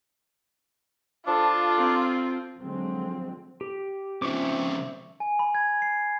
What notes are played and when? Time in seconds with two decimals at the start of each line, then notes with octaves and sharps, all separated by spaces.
1.27 F3 D4 F4 A4
1.78 C4 A#4
2.58 D3 F3 F#3 G#3 C4
3.61 G4
4.22 C#3 F3 C4 E5 C#6 D6
5.20 G#5
5.39 B5
5.55 G#6
5.82 C7